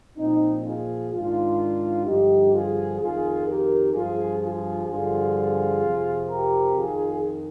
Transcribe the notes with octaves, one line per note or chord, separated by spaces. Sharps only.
A#2 F3 C4 D#4
F4 G#4
G#2 D#3 D4 F4
G2 D3 F3 D#4 G4
F4 G#4
F2 D#3 F4 G#4
G4 A#4
G2 F3 F4 G#4
F4 G#4
G2 D3 F3 F4 G#4
F2 C3 F3
G4 A#4
F2 D#3 F4 G#4